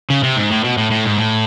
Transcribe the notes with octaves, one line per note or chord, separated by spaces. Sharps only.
C#3
C3
G#2
A2
B2
A2
A2
G#2
A2